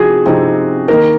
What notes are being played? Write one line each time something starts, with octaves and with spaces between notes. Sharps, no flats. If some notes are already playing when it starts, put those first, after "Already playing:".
Already playing: C3 F3 C4 D#4 F#4 G#4
C3 F3 C4 D#4
D#3 A#3 D#4 A#4